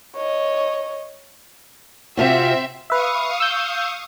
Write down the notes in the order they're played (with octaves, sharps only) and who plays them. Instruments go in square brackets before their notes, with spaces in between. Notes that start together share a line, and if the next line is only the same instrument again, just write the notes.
[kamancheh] C#5 D#5
[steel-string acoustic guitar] C3 F4 F#4 [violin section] C4 E5
[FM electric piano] B4 E5 [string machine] F5 C#6 D#6
[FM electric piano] E6 G6